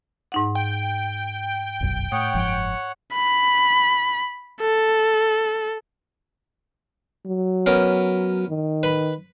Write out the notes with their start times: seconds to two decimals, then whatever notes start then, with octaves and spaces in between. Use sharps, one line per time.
0.32 G#2 D#4 F#5
0.55 G5
1.81 F1 B1 F#2
2.12 A2 C#5 F#5 D#6
2.34 F#1 G#2 F3
3.14 B5
4.61 A4
7.27 F#3
7.66 B3 C#4 A#4
8.49 D#3
8.83 B4 B5